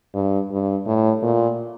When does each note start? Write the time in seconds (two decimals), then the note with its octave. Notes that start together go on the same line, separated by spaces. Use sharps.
0.14 G2
0.51 G2
0.87 A2
1.23 A#2